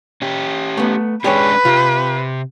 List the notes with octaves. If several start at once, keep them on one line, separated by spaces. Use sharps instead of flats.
C#4 G4
A3 B3
G#3 C#4 D4 G4 G#4 B4 C#5
C3 F4 G4